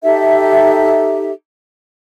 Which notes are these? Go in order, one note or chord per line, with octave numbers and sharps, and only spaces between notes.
D#4 G4 A4 E5